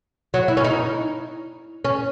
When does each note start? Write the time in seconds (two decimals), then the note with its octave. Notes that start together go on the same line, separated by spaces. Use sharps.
0.34 F#3
0.48 E4
0.57 C#4
0.64 D#4
1.85 C#4